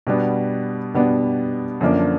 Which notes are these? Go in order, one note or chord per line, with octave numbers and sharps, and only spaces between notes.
B2 G3 B3 D4
B2 G3 B3 D4
F#2 D3 F3 A#3 D4